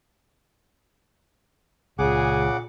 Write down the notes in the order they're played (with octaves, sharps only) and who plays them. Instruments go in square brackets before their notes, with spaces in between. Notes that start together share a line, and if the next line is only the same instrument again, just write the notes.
[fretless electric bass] C#2 [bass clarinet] A#2 [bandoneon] C#3 F#5 D6 [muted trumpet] G#4